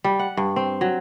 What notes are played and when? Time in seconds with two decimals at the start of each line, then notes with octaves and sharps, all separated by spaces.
0.04 G3
0.19 F#5
0.37 G2
0.56 C4
0.81 F#3